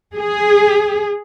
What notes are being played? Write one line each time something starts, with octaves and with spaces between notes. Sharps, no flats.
G#4